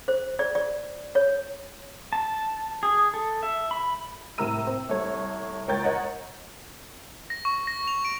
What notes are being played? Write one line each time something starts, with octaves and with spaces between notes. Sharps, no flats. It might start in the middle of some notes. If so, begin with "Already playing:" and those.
C5
D5
D5
C#5
A5
G#4
A4
E5
B5
A2 C3 A#4 A#5 E6 D#7
C4
C2 A3 C#5
C#2 A#4 C#5 G5 G6 A6
A#4 C#5 D#5 F#5 A#5
A#6
C#6
A#6
F7
D7